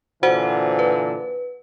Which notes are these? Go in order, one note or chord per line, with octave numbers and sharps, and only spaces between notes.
A#2 D3 E3 F#4 C5 F#5
B4